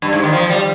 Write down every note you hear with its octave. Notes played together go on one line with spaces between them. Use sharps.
G2
G#2
D#3
F3
G3